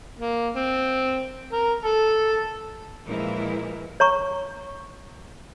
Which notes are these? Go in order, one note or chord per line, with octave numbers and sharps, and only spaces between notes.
A#3
C4
A#4
A4
A#2 E3 F3 G#3 E4 A#4
C#5 A#5 C#6